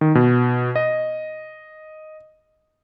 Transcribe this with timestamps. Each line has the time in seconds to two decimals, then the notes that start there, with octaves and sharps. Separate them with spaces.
0.01 D#3
0.15 B2
0.76 D#5